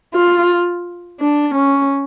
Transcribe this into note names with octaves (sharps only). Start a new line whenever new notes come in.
F4
D4
C#4